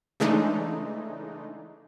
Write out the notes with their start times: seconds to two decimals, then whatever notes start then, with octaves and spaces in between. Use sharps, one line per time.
0.20 C#3 E3 G#3 A3 D4 D#4